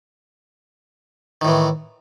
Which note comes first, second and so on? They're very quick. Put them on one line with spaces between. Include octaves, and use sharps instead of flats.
D#3 A2 E3